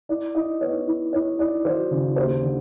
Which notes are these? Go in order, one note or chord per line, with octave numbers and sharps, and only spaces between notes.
E4 D5
E4 D#5
B3 C#5
E4
E4 C#5
E4 D5
F#3 C5
C#3
D#2 C5
D3